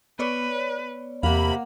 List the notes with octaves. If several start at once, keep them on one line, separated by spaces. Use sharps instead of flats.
B3 B4 C#5 D5
E2 C3 A#3 F5 F#5 B5